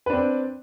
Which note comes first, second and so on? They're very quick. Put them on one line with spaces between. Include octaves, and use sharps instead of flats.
B4 D4 C4